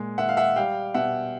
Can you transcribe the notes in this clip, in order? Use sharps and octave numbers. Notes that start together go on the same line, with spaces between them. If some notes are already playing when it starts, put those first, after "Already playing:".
Already playing: A#2 G#3
D#3 E5 F#5
F5
E5 F#5
G3 F5 G5
B2 E5 F#5